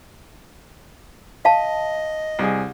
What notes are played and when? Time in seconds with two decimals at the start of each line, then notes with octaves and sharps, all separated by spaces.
1.45 D#5 F5 A5
2.39 C2 G#4